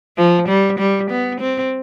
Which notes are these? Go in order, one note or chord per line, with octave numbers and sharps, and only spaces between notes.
F3
G3
G3
B3
C4